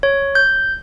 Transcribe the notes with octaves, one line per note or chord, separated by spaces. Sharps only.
C#5
G6